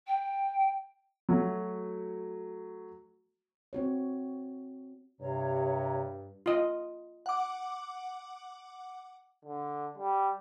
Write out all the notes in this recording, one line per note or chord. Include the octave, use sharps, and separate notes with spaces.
G5
F#3 A3 F#4
C4 F#4 C#5
G2 C3 C#5 A#5
F4 D#5
F#5 D6
D3
G3